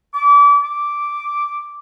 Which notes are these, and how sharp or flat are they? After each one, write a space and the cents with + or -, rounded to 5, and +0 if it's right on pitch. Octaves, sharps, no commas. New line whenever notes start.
D6 -30
D6 -5